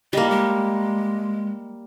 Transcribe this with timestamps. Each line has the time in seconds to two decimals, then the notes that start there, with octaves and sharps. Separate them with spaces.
0.13 G3 A#3 D#5
0.30 G#3